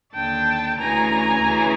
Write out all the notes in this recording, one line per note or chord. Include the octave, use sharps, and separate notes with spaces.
D#2 D3 G5 A5
D2 C#3 E3 G#5 A#5
D2 C#3 E3